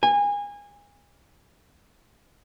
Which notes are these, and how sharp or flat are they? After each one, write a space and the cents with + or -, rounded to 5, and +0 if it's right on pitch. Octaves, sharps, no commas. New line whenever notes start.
G#5 -25